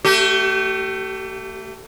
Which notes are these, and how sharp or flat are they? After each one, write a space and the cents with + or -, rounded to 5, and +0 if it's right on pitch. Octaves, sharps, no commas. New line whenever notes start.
A3 +20 G4 -35